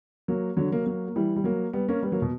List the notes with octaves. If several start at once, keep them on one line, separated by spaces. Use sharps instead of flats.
F#3 A#3
D3 F#3
F#3 A#3
F#3 A#3
A#3
E3 G3
G3
F#3 A#3
G3 B3
A#3 C#4
G3 B3
F#3 A#3
B2